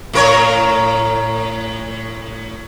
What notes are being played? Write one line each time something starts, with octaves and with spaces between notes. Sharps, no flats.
A2 A#4 C#5